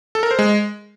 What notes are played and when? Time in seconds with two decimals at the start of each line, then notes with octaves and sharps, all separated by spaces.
0.15 A4
0.23 A#4
0.31 C5
0.39 G#3